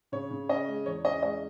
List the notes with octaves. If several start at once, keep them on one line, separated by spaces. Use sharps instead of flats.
C#3 C#5
C#3
C#4 D#5
G#3
E2 C#5
C#4 D#5
G#3 D#5